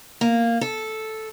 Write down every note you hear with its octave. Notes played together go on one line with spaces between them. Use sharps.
A#3
A4